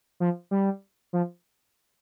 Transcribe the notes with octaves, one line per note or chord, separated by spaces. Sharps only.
F3
G3
F3